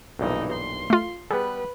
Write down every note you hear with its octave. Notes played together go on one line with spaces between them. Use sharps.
B1 G2 A#2 E3 D#4
C6
A3 F4
G3 B3 G#4 B4